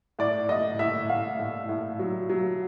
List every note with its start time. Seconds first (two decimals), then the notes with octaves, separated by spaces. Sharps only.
0.19 A2 D5
0.49 A2 D#5
0.79 A2 E5
1.09 A2 F5
1.40 A2
1.69 A2
1.99 F#3
2.29 F#3